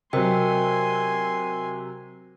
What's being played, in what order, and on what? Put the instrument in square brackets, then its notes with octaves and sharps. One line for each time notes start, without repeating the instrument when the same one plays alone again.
[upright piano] C3 F#3 [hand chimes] A#4 D#5 G5 [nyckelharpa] G#5 C6